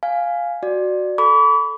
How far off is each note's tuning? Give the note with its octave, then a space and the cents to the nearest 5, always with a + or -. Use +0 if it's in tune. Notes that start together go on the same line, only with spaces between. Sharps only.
F5 +0 G#5 +0
F#4 +0 D5 +15
A4 +0 B5 +0 D6 -45